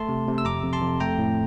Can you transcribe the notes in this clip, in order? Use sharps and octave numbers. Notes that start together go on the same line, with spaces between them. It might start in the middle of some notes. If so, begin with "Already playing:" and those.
Already playing: A3 A5 C6
C3
C3
E6
F2 A#5 D6
F2
A5 C6
F2
A3 G5 A#5
A2